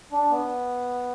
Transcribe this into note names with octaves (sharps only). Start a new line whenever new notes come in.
D4
B3